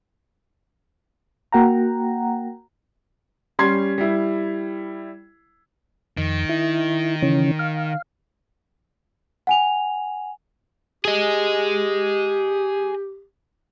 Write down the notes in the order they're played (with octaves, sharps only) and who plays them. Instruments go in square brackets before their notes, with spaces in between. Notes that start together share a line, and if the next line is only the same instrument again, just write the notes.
[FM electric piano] A#3 F#4 F#5 G5 A#5
[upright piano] G3 C#4 C6 G#6 C7
G3 E4
[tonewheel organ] F2 [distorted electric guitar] D#3
[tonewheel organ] E4
C#3 E3 C#4
F5
[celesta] F#5 G#5 F7
[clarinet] G4 [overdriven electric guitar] G#4 D#5